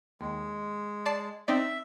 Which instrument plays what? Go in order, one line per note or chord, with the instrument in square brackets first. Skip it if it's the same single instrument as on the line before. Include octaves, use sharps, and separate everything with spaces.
[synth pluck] D#2 [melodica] G#3
[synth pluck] D5 A5 C7
[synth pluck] C4 D#4 D5 [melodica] E5